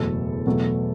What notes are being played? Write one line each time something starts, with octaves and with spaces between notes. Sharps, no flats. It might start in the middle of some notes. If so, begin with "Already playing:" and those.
Already playing: F#1 E2 B2 A3 A4
E2 B2 F#3 A3